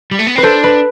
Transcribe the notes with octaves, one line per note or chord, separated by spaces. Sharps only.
G3
A3
B3
C4 B4
D4 A4 C5
B4